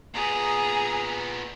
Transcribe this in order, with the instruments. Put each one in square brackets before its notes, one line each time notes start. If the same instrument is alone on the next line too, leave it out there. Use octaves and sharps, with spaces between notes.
[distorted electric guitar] A#2 B3 [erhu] G#4 [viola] A#5